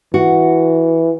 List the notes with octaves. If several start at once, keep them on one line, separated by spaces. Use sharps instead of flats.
E3 F#4